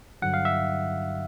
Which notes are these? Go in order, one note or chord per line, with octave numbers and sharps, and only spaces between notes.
G2 D3 F#3 F#5
F5
E5